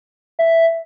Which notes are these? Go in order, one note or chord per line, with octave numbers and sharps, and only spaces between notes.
E5